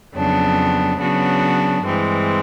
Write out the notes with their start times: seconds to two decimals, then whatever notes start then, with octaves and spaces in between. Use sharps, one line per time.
0.14 F2 C#3 F#3 B3 D4
0.99 C#3 F#3 B3 D4 F#4
1.83 G2 E3 G#3 C4